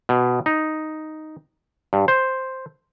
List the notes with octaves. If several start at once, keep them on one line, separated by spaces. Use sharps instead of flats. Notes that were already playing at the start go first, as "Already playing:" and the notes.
B2
D#4
G2
C5